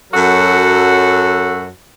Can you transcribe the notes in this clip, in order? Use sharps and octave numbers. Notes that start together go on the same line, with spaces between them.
F#2 F#3 F#4 A4